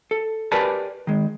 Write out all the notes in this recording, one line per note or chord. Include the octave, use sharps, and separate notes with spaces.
A4
G4 A#4 B4 D5 G#5 A5
D#3 G#3